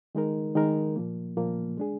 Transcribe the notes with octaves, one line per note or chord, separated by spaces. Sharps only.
D#3 G#3 D#4 A#4
D#3 G#3 D#4 A#4
A#2 F3 A#3
A#2 F3 A#3
G#3 D4 G#4